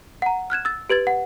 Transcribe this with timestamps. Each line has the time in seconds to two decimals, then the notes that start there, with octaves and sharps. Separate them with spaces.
0.22 F#5 A#5
0.50 F6 F#6 G#6 E7
0.65 E6 A6
0.90 G4 B4 G#6 A6
1.07 F#5